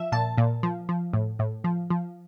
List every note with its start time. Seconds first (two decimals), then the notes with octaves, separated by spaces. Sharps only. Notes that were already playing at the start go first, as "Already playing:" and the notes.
Already playing: F3 E5
0.12 A#2 A5
0.38 A#2
0.63 F3
0.89 F3
1.13 A2
1.39 A2
1.64 F3
1.90 F3